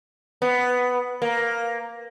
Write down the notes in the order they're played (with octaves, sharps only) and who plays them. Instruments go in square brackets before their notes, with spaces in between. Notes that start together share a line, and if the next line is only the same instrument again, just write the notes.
[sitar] B3
A#3